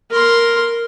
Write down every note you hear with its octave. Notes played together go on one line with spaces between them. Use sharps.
A#4 C6